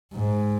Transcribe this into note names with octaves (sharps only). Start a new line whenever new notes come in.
G#2